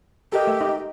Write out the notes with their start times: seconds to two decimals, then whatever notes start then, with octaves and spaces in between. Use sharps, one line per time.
0.32 G4 A4 A#4 D#5
0.47 A3 E5
0.61 D#4 D#5